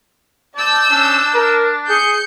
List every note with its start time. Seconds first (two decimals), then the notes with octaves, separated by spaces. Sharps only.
0.56 D5 A5 E6 G6
0.91 C#4 D4
1.35 A#4
1.89 G#4 G6 C#7